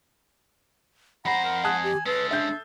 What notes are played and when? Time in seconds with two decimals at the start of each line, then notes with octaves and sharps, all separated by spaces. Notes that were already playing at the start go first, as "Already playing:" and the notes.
1.25 F2 C5 F#5 A#5 B5
1.44 A#4
1.64 G#5 A5 D#6 F#6
1.83 G4
2.06 G#3 C#4 A4 B4
2.31 D4 E5 G6